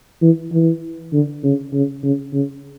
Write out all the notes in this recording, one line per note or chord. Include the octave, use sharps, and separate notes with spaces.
E3
E3
D3
C#3
C#3
C#3
C#3